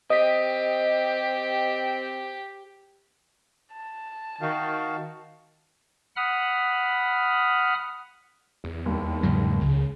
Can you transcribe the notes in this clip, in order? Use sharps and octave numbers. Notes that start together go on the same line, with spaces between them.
C4 G4 D#5 B6
A5
D#3 F#4 F5
F#5 B5 D#6 F6
E2
D#2 G3
G#2 C#3 F#3
C#2 C#3